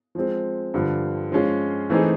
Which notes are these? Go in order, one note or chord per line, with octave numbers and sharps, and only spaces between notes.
F3 G#3 C4
G2 D3 F3
F3 G#3 C#4 F4
E3 A3 C4 D#4 G#4